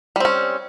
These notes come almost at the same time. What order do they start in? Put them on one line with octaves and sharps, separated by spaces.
G3 C4 C#4